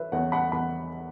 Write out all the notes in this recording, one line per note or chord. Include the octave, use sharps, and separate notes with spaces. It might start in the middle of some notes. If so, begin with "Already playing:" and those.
Already playing: E3 B4 C#5 E5
E2 C#5 F#5
F#5 B5
E2 F#5 B5